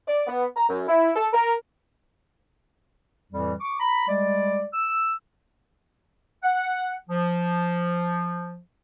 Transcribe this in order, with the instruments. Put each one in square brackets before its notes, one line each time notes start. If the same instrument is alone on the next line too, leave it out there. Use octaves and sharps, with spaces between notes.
[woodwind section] D5
B3
A#5
F#2
E4
A4
A#4
F2 A2 E3 G3
C#6 D6
A#5 B5
G3 G#3 D5
E6
F#5
F3